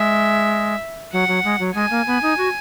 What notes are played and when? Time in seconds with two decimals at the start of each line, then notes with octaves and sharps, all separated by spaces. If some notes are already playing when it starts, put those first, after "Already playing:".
Already playing: G#3 E5
1.13 F#3 F#5
1.28 F#3
1.44 G#3
1.59 F#3
1.75 G#3 G#5
1.91 A#3
2.07 B3
2.22 D#4
2.38 F#4